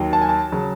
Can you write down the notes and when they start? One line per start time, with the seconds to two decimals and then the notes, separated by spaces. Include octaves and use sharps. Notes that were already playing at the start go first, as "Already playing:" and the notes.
Already playing: D#2 D#3 F#3
0.13 A5
0.21 G#5
0.29 A5
0.52 C#3 F#3